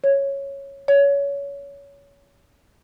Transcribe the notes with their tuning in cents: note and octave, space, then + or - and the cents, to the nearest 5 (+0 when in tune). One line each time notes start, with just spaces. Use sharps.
C#5 -5
C#5 +25